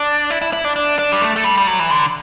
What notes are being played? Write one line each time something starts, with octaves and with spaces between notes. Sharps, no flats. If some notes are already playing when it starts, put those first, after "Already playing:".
Already playing: D4
E4
E4
E4
D4
D4
D4
G3
A3
A3
G3
G3
F#3
E3
D3